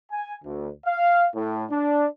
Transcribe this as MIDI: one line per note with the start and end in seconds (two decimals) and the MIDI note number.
0.12 0.35 80
0.45 0.70 38
0.86 1.27 77
1.35 1.65 45
1.71 2.08 62